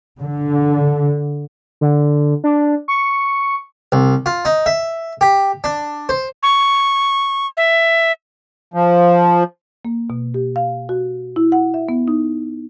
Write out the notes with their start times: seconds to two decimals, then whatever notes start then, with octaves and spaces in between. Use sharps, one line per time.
0.20 D3
1.81 D3
2.44 D4
2.88 C#6
3.92 C2
4.26 F4
4.45 D#4
4.66 E5
5.21 G4
5.64 D4
6.09 C5
6.43 C#6
7.57 E5
8.74 F3
9.85 A#3
10.10 B2
10.34 G4
10.56 F5
10.89 F#4
11.36 E4
11.52 F#5
11.74 E5
11.89 B3
12.08 D#4